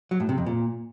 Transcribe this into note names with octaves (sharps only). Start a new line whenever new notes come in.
F#3
A2
C3
F2
A#2